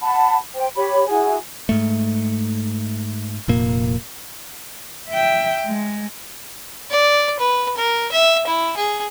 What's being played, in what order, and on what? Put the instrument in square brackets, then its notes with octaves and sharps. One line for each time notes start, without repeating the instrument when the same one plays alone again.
[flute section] F#5 A5 B5
C5 G5
G4 C#5 B5
E4 F#4 G#4 G#5
[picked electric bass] G#2 A3
F1 A#2 A#3
[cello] E5 G5
G#3
[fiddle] D5
B4
A#4
E5
E4
G#4